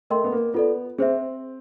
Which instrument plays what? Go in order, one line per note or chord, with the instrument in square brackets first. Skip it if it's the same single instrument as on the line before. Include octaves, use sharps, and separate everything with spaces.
[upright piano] A3 [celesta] A#4 D#5 G5 C6
[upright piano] B3
A#3
[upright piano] B3 [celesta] F4 A4 D5
[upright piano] C4 [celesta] G#4 C5 E5